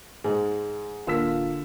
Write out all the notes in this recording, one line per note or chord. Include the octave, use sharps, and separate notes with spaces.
G#2 G#3
D1 D3 A#3 F4 E6 B6